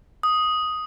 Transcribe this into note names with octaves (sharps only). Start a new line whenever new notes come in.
D#6